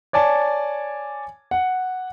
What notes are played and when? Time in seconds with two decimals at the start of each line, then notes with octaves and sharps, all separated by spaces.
0.13 C#5 D5 G#5 A5
1.51 F#5